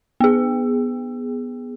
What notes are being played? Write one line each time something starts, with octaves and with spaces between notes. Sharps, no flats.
B3 G#4